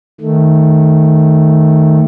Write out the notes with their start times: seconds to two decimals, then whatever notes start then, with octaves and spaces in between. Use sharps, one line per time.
0.21 D#3 A3